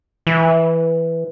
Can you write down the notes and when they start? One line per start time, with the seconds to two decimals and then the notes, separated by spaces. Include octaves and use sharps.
0.27 E3